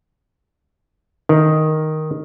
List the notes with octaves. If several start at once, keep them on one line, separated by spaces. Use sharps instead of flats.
D#3